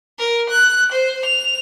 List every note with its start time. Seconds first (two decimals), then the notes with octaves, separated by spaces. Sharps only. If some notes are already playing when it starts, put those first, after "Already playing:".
0.19 A#4
0.50 F#6
0.92 C5
1.25 F7